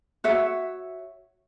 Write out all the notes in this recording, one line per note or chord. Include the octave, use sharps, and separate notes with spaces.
F#4 C#5 E5